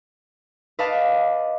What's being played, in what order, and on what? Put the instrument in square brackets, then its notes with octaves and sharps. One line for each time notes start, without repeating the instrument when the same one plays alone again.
[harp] B4 D#5 F5 A5 D6